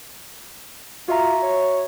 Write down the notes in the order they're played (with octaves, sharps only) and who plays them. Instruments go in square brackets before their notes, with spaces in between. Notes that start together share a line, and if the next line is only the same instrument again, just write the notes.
[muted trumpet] F4 [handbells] F#4 E5 A#5
[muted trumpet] C#5